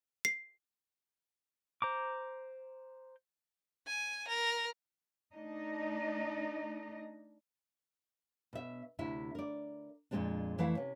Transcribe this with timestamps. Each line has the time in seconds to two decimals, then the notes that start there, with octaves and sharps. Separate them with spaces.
0.25 C7
1.82 C5 A#5 D6
3.87 G#5
4.28 A#4
5.34 A3 D4 D#4 D#5
8.53 B2 E5
8.99 D2 C3 E4 E5
9.35 A#4 D5
10.11 F2 A#2 C#3 G#3 C4 D4
10.58 F2 E3 A3 E4 F5 F#5
10.75 C3 C#4